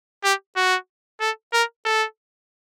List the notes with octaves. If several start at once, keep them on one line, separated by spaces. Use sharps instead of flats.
G4
F#4
A4
A#4
A4